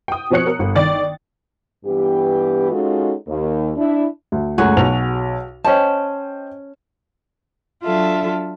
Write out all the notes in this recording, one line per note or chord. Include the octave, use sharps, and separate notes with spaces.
G5 D#6
B2 F3 C4 C#5 F#6 C#7
A#4
G1
D#3 D5 A6
G2 E3 B3 G4
G#3 C#4 D#4 F4 F#4 A4
D#2
D4 E4
D2
C#2 F#2 A3 F#4 G#4
B1 F7
C#4 C5 D#5 G5 A5
F#3 D4 F4 A4 E5